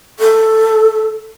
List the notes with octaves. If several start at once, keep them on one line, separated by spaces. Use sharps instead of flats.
A4